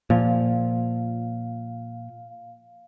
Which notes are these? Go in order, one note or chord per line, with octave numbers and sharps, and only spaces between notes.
A#2 F3 F5